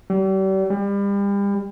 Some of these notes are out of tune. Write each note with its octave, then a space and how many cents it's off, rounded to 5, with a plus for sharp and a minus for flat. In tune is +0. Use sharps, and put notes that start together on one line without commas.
G3 -40
G3 +35